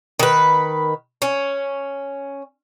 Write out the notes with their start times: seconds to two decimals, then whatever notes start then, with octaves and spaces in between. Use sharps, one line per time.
0.19 D#3 B4
1.22 C#4